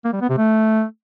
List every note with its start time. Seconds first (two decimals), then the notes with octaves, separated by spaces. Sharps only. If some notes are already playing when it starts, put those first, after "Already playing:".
0.05 A#3
0.13 G3
0.21 B3
0.30 C3
0.38 A3